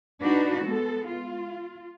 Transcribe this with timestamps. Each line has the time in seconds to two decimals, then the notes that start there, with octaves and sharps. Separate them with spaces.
0.23 D4 D#4 F#4 B4
0.66 G#3 B3 A4
1.06 F4